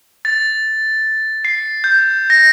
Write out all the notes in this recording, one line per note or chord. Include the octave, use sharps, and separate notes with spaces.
A6
C7
G6
A#6